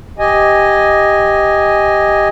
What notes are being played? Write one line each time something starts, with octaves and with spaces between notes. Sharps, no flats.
G4 D#5 G#5